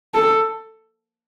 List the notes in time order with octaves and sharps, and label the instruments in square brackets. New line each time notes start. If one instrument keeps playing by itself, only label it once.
[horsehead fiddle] A4